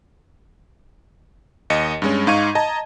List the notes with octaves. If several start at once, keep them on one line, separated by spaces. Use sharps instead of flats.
D#2 D#5 C#7
G2 G#3 C#4
G#2 D#4 F5 C#6 G#6 D#7
D#5 A5 A#5